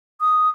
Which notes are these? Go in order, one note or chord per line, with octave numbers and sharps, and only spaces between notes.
D#6